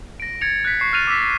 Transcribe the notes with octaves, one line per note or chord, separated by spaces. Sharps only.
A#6 D7
G#6 A6 C#7 F7
F#6 B6
C#6 C7
F6 F#6 A6 D#7 F7
D6 E6 B6